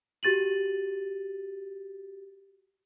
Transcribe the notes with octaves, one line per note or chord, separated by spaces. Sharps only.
F#4 G4 A6 D#7 F#7